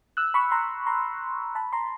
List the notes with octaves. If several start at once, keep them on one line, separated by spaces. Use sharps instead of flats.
E6 F#6
B5 C#6
A#5 C6
A#5 C6
A5 B5
A#5 C6